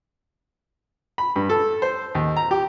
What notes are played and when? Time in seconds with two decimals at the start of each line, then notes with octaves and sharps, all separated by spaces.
1.18 B5
1.36 G2
1.50 A4
1.82 C5
2.15 D#2
2.36 A#5
2.51 G4